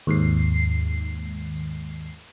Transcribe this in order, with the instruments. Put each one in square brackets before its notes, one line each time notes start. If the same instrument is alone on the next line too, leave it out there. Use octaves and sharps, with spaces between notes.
[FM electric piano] D#2 G#2 C7